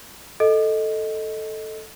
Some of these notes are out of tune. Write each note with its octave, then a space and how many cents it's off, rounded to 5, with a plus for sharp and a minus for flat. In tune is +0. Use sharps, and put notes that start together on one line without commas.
A4 +0 D#5 +0